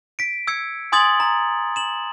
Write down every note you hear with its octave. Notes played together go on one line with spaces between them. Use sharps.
B6 D7
E6 G#6 C#7
G#5 C6 D#6 G#6 A6 F#7
A#5
E7 F#7